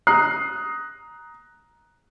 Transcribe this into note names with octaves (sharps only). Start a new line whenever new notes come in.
A#5 D#6 F#6 C7